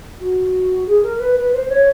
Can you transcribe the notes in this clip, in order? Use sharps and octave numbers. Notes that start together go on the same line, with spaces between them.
F#4
G#4
A#4
B4
B4
C5
C#5